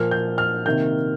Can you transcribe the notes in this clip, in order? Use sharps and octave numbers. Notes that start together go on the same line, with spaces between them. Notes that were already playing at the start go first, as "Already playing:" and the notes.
Already playing: A#2 F3 A#3 F6
G6
F6
C3 D#3 A#3 G6